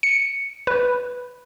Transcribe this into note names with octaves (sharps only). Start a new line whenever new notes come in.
C#7
B4